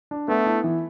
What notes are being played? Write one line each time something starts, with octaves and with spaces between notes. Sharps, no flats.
D4
A3 B3
E4
E3